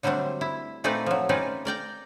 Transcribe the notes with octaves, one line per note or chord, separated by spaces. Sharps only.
D3 F#3 G3 A3 C4 D4
E4
A#2 A3 C4 D#4 B4 D5
F3 F#3
C4 C#4 D#4 F4 B4 D5
A#4 D5 G5 A#5